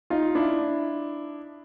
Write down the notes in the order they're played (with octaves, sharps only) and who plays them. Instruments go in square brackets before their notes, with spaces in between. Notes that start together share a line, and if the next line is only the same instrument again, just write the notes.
[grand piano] D#4 F4
D4 E4